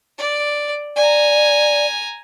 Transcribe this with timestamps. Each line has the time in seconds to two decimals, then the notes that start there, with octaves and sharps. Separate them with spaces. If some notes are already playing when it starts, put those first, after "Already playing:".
0.18 D5
0.96 D5 G#5 A#5